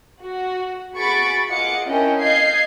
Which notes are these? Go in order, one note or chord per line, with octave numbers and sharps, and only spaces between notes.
F#4
F#4 G#4 B5 C#6 A6 D7
F4 G#4 D#5 F#5 D6 C#7
C#4 D4 E4 A#4 D#5 G5
D#5 F5 G6 G#6 C7